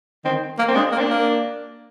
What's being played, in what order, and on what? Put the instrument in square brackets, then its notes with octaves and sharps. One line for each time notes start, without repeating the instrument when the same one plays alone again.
[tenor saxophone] D#3 [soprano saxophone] C4
[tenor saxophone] A#3
[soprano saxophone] C4
[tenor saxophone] G#3 [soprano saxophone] D4
[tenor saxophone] A#3
[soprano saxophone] C4
D4
[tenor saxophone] A#3